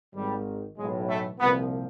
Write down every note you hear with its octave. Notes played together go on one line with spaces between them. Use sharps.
G#1 G#2 D#3 G3
B1 A2 E3 G#3
A3
C2 A#2 F3 B3